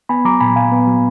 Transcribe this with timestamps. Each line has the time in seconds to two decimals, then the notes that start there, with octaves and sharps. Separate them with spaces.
0.09 B3 G#5 B5
0.25 F#3 A#5 D6
0.40 A#2 G#5 B5
0.56 A#2 F5 G#5
0.72 B3
0.87 F#3